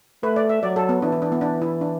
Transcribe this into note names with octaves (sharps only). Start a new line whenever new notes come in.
A3 B4
D5
E5
F#3 D5
A4
B3
E3 D4
E4
D4
B3
D4
E4
D4